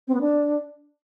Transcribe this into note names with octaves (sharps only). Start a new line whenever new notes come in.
C4
B3
D4